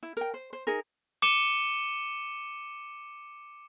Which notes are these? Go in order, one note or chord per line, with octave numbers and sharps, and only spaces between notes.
E4
A#4 G5
C5
C5
D#4 G#4 A#4
D6 C#7 D#7 E7 G7